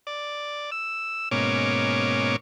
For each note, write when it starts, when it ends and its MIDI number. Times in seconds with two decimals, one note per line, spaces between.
0.07 0.70 74
0.72 1.29 88
1.31 2.36 44
1.31 2.36 47
1.31 2.36 58
1.31 2.36 61
1.31 2.36 73
1.31 2.36 86